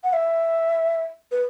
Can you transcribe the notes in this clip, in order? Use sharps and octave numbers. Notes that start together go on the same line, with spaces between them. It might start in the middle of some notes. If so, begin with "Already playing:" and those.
F#5
E5
B4